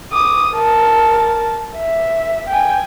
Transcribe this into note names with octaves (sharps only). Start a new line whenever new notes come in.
D6 D#6
A#4 A5
E5
G5 G#5